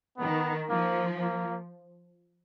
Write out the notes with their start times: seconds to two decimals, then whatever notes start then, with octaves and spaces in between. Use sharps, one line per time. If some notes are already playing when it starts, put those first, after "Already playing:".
0.18 D#3 B3
0.70 F3 A#3
1.21 A#3